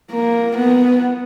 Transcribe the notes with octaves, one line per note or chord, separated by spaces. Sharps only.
A#3
B3